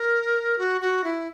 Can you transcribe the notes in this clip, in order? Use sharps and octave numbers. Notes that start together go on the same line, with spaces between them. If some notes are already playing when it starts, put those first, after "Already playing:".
Already playing: A#4
F#4
F#4
E4